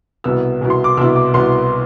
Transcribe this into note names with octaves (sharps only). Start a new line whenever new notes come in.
C2 B2 B3 E4 E6
C2 B2 B3 E4
C6
D6
C2 B2 B3 E4 E6
D6
C2 B2 B3 E4 C6